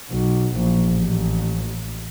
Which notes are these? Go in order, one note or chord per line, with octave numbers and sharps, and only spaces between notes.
B1
A#1
A1